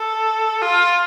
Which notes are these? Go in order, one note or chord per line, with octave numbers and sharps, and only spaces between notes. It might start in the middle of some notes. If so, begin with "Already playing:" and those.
Already playing: A4
F4